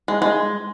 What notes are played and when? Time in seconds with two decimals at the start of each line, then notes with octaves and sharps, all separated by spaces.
0.08 G#3
0.22 G#3